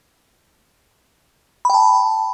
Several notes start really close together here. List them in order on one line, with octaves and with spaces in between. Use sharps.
B5 G5 A5